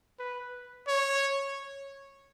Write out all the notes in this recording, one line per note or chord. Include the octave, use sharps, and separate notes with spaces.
B4
C#5